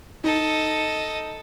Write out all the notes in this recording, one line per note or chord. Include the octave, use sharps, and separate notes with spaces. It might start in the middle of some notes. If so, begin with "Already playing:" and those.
D#4 A4 D#5